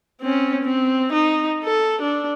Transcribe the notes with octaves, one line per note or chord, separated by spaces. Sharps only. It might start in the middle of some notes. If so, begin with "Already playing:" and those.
C4 C#4
C4
D#4
A4
D4